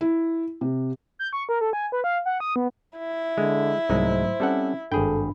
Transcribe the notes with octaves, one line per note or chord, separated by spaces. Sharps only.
E4
C3
G6
C#6
A#4
A4
G#5
B4
F5
F#5
D#6
B3
E4
D3 G#3
C2 G#2 F#3 G#3 A3 D#4 C5
G3 C4 C#4 A4 F#5
G#1 G2 D4 G#4 A4 G5 B5